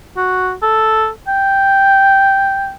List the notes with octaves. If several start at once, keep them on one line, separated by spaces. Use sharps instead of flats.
F#4
A4
G5